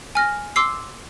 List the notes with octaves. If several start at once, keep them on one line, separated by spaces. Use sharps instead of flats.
G#5 F6 A#6
C6 D6 E6 C7